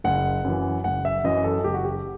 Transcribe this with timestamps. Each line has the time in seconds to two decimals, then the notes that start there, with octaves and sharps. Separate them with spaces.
0.04 F#1 F#5
0.44 F#2 E3
0.84 F#1 F#5
1.05 E5
1.24 F#2 E3 D#5
1.44 A4
1.64 F#1 G4
1.74 F#4
1.84 G4